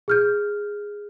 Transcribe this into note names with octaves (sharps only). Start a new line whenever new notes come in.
G#4 F6 G6